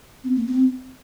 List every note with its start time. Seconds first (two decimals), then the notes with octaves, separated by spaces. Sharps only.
0.24 C4
0.36 A#3
0.47 C4